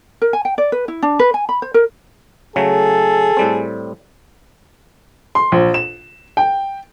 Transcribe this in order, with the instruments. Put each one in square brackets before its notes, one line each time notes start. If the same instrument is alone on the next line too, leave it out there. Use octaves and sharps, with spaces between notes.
[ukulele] A#4
G#5
G5
D5
B4
E4
D4
B4
G#5
B5
C5
A#4
[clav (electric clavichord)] C#3 F#3 A3 [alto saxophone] G#4 [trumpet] A4
[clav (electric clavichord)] A2 G3 C4
[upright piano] C6
A#1
E7
G5